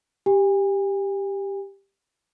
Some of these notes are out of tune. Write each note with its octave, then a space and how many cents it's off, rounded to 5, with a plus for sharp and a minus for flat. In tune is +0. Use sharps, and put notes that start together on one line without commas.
G4 +5 G#5 -35